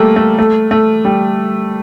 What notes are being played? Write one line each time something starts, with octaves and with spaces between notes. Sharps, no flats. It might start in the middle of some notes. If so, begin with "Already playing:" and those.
Already playing: G3 A3 A#3
A3
A3
A3
G3